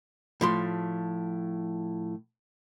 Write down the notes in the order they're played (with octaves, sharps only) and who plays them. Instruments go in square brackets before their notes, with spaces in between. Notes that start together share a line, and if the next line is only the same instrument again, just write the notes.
[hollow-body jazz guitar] A2 F3 C6